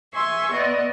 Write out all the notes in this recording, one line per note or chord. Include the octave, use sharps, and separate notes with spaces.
E5 G#5 C6 C#6
B3 D5 D#5